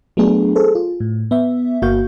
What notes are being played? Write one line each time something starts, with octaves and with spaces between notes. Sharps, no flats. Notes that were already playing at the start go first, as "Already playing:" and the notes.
F#3 A3 B3 D4 G#4
G#4 A4 C5
F4
A2
B3 E5
G1 A#3 F#4 F5 C#6 G6